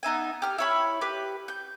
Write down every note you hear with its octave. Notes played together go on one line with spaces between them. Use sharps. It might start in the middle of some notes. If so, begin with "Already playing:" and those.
B3 D#4 E5 G#5
G4 F6
E4 C#5 B5
G4 B4
G6